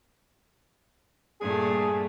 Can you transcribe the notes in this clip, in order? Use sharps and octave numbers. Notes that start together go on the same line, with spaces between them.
G2 A#2 A3 G#4